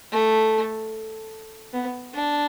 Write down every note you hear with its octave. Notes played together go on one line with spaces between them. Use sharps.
A3
B3
D4